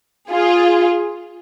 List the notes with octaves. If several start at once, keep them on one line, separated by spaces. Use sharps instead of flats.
F4 G#4